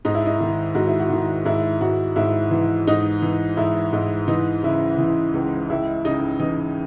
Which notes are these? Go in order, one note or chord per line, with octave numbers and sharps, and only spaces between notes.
G#2 D#4
E4
D#4
D#3
G#2 F#4
E4
F#4
D#3
G#2 E4
G#2 F#4
G#2 E4
E3
G#2 D#4
E3
G#2 E4
G#2
E3 D#4
C#3 E4
E3
C#2
C#2 E4
C#3 D#4
E3 D#4